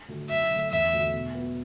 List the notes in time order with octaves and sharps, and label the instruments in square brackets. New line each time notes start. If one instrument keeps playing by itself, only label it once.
[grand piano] D3 A3 F#4 A4
[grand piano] F#2 [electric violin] E5
[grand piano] D3 A3
[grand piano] E2 [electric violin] E5
[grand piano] D3 A3 F#4
B2
B3 F#4 B4